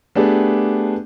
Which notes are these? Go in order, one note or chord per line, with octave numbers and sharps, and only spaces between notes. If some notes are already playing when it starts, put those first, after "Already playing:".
A3 B3 D4 G4 G#4